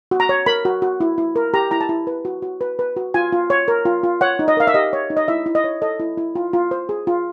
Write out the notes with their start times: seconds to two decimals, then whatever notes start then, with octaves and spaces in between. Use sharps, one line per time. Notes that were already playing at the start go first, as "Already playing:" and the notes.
0.11 F#4
0.20 A#5
0.29 C#5
0.46 A#4 B5
0.65 F#4
0.82 F#4
1.00 E4
1.18 E4
1.36 A#4
1.54 G4 A#5
1.71 E4 A#5
1.81 A5
1.89 E4
2.07 B4
2.25 F#4
2.42 F#4
2.61 B4
2.79 B4
2.96 F#4
3.14 F4 G#5
3.32 F4
3.50 C#5
3.68 A#4
3.85 F4
4.03 F4
4.21 C#5 F#5
4.39 D#4
4.48 D#5
4.57 A#4 F5
4.67 E5
4.74 G4 D#5
4.93 C#5
5.10 D#4
5.17 D#5
5.28 E4 E5
5.46 E4
5.55 D#5
5.64 C#5
5.82 A4 D#5
6.00 E4
6.18 E4
6.35 F4
6.53 F4
6.71 C5
6.89 G#4
7.07 F4